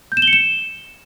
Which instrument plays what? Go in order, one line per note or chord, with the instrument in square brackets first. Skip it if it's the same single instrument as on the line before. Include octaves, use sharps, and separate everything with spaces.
[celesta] G6
E7
G7
C#7
E7